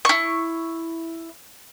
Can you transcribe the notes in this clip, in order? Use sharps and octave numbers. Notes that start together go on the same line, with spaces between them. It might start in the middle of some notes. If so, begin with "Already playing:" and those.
E4 C#6